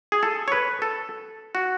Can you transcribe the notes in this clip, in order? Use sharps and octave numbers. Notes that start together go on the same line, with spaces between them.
G#4
A4
C#5
B4
A4
F#4